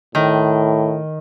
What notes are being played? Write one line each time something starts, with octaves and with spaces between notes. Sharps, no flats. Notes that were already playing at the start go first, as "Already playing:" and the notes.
A2 D#3